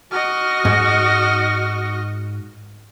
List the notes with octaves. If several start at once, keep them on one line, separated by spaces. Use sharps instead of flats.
F#4 D#5 F6
G#2